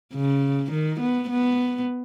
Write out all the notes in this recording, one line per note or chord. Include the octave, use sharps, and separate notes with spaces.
C#3
D#3
B3
B3